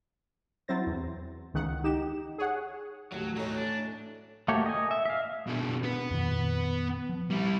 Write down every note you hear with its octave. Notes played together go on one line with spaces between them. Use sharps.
F#3 C4 E4 C5 A6 A#6
E2
C#2 D#3 F#5
D#4 G4 E7
G#4 C#5 F#5
A1 D#2 F#3
A2 F#3 C#4 D#4
D4
A3 A#3 F#4 G4 C#5
D#5 G#5
E5
E5 F5
B2 D4
B3 B4
F2 A#2 D#3
F3
G3 E4